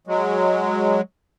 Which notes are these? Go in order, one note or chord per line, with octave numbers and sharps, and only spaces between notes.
F#3 G#3